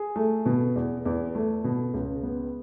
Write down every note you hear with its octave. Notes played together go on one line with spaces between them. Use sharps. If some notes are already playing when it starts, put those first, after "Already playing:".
Already playing: G#4
A3
B2
E2
E2
A3
B2
C#2
B3